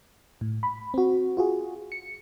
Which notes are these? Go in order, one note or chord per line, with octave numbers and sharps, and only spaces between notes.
A2
B5
C4 F#4
F4 F#4 G#4
C#7